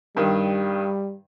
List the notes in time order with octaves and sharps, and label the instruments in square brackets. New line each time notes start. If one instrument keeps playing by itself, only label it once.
[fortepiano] G2 D#3 [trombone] G3